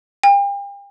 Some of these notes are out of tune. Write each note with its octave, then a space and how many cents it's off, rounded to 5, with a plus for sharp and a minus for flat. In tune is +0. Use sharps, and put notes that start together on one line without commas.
G5 +40